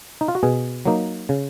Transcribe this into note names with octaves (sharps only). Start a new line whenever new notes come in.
D#4
F4
F#4
B2 G#4
F#3 A#3 D#4
C#3